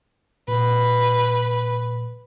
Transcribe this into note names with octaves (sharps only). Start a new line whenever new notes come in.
A#2 B4